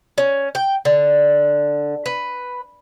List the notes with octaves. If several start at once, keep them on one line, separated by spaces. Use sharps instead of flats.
C#4
G5
D3
B4